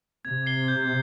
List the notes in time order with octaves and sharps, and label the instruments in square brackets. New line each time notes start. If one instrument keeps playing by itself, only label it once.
[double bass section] C3 [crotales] G#6
[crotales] C7 G7
G6